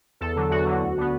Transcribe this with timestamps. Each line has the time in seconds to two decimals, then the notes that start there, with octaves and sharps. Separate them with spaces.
0.21 E2 A4
0.36 D3 F#3
0.50 E2 F#4
0.66 D3 F#3
0.82 D2
0.97 D3 B3